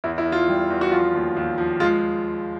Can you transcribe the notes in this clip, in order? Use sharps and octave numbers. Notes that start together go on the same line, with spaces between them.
E2 E4
E4
E2
F4
G3
E2
F#4
F3 F4
D#2
D#2
F3
G#3 F4